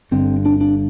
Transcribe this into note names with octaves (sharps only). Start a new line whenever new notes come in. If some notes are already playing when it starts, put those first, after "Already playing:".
G1 G2 D3 C4
D4
D4